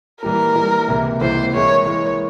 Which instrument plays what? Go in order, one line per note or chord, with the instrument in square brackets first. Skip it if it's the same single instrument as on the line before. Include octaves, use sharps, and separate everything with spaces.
[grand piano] E3 G3 A#3 [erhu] A#4
[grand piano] E3 G3 A#3
C#2 C3 E3 A#3 E4
[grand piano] C#2 C3 E3 A#3 E4 [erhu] C5
[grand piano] E3 G#3 E4 A#4 [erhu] C#5
[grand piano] E3 G#3 E4 A#4 [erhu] C#5